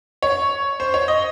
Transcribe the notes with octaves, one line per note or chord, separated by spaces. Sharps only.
C#5
C5
C#5
D#5